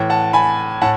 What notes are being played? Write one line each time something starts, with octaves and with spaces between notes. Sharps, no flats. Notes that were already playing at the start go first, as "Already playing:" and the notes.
Already playing: A2 E3
F#5 A5
G#5 B5
A2 F#5 A5